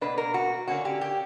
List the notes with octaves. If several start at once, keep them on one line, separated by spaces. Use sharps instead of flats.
B2 A#3 D4 B4
A#4
F#4
D3 A#3 C#4 F#4
G4
G4